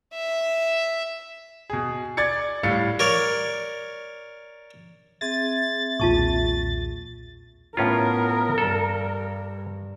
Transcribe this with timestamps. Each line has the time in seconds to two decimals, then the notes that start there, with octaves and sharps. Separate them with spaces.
0.14 E5
1.70 B2 G#4
2.17 D5 G#6 A6 C#7
2.63 A2 G3 F5 A6 C#7
2.99 A#4 C#5 D5
5.21 C4 G#4 E5 A6
6.00 B1 E2 A#2 F4 A5 C#6
7.77 A2 B3 C#4 F4 A#4
8.58 G2 A4